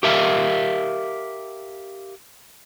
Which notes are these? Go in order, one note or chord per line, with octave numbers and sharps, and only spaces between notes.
G4 A#4 E5 F5